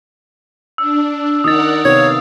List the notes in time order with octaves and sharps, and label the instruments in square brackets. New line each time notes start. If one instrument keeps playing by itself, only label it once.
[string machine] D4 [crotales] E6
[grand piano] D#3 D#4 [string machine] A#4 D5 F#5 [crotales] D#6 A6
[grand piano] C3 D#3 B3 [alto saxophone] C#5 [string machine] F5